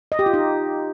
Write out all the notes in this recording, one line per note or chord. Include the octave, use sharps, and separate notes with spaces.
D#5
G4
F4
D#4